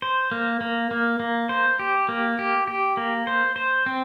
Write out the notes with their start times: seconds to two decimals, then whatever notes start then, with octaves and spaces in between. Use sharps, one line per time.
0.02 C5
0.31 A#3
0.61 A#3
0.91 A#3
1.20 A#3
1.49 C5
1.79 G4
2.09 A#3
2.39 G4
2.67 G4
2.97 A#3
3.27 C5
3.56 C5
3.86 C4